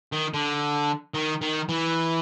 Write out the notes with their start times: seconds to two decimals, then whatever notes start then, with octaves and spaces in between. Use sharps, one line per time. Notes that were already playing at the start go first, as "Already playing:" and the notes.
0.12 D#3
0.34 D3
1.14 D#3
1.41 D#3
1.69 E3